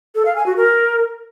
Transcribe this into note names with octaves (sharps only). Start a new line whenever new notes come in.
A4
F5
G#5
F#4
A#4